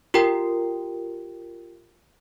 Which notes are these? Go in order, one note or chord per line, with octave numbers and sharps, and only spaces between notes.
F4 G4 A#4 G5